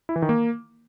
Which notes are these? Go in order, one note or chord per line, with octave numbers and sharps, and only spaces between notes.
E4
E3
D#3
A#3